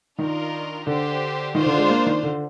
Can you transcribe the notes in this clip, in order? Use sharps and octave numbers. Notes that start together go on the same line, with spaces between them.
D#3 D4 F4 A#4 D#5
D3 D4 G4 C5
D#3 D4 F4 C5
D3
G#3
A#3
D#3
D3